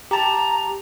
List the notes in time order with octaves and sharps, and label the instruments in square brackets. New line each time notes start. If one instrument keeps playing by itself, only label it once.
[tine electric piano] G4 A5 [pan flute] A#5